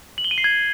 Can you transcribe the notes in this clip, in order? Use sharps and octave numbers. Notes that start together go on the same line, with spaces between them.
F#7
G7
D#7
C7
G#6